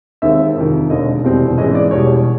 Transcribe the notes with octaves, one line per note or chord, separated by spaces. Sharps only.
D#2 D#3 G#3 C4 E5
F2 C3 D#3
E1 D#2 D3 D#5
F1 E2 B2 G3 C4
G#2 E3 G#3 C#4 D#5
D5
E1 E2 B2 G3 C#5